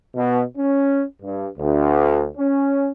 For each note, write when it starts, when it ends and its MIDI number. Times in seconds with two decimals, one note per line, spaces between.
0.15 0.43 47
0.57 1.03 61
1.22 1.47 43
1.59 2.28 38
2.37 2.91 61